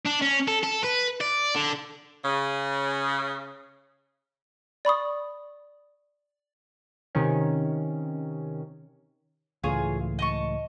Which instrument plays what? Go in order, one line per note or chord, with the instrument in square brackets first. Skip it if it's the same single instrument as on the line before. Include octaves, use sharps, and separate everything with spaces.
[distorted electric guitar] D4
C#4
A4
A4
B4
D5
D3
[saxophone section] C#3
[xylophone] D5 B5 C#6 D#6
[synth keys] C3 D#3 C#4
[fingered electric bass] C#2 A2 E3 [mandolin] F4 G#4 C#5
[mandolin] D#5 A5 C#6